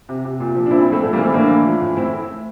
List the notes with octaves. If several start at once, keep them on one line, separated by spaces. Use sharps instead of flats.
C3
C3
A#2
F3
D4
A#2 C4 E4
C4 E4
F3
A3 C4
A2 A3
G3 A#3
E3
A3 C4
A2 A#3 D4
E3
F3
A2
A2 C4 E4